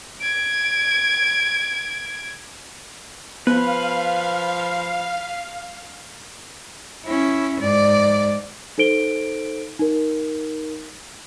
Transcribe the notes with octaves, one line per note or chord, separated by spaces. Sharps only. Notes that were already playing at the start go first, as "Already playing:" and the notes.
G#6 D7
F3 B3 B4 F5
C#4 E4
G#2 D5
D#4 A4 C5 D7 G7
D#4 A#4